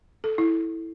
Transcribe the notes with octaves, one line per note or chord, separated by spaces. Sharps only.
A4
E4